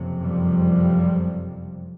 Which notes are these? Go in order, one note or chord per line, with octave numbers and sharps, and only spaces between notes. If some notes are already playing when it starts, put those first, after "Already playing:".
Already playing: F#1 F2 C3
F3 G3